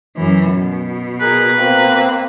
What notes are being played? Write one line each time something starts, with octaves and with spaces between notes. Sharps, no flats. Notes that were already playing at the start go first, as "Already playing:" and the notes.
F#2 E3
B2
G#4 A#4 B4
A#3 C4